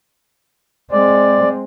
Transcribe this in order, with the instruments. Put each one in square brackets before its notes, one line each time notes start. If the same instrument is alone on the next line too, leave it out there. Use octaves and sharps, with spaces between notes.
[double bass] G#3 C4 [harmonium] D5